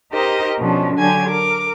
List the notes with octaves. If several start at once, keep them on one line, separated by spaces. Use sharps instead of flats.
D#4 G4 A#4 C5 D#5
B2 F3 C#4 D4
D3 F#3 D4 G4 G#5 G#6
A#4 D6